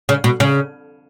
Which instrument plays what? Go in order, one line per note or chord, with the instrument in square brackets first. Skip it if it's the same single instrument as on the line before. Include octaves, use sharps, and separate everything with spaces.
[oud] C#3
B2
C#3